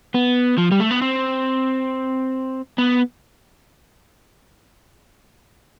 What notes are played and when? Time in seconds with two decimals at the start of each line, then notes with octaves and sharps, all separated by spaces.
0.14 B3
0.58 F3
0.72 G3
0.80 A3
0.91 B3
1.02 C4
2.78 B3